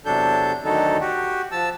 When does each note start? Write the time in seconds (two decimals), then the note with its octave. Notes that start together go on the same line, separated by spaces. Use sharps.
0.05 E2 C3 F#3 D4 A4 G6
0.64 D2 D3 D#3 F#3 D#4 A4
1.01 F#4 G4
1.52 F3 A5 E6